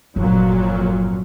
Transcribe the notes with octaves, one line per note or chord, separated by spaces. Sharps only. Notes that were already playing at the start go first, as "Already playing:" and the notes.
G1 F2 A#2 F#3